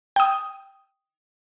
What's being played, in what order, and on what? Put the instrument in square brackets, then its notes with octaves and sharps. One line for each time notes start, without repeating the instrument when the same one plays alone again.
[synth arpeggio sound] G5 D#6